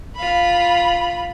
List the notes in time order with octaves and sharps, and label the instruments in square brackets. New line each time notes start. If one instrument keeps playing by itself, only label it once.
[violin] F4 B5